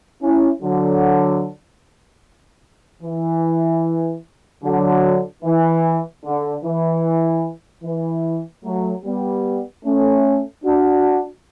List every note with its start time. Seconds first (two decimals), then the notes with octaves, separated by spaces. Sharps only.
0.22 C#4 E4
0.62 D3 F#3
3.03 E3
4.64 D3 F#3
5.43 E3
6.25 D3
6.65 E3
7.84 E3
8.64 F#3 A3
9.04 G3 B3
9.85 A3 C#4
10.65 D4 F#4